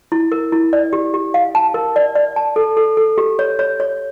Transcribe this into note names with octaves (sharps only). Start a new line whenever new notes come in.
E4
A#4
E4
D5
G4
G4
F5
A5
A#4
D5
D5
A5
A4
A4
A4
G4
C#5
C#5
C#5